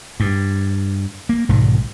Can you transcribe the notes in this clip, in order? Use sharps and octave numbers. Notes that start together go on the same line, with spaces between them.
G2
A#3
B1 G#2 D#3